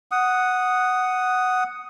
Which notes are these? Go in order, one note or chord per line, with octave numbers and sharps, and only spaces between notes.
F#5 D#6